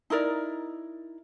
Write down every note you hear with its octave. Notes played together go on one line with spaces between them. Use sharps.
D#4 E4 A#4 D5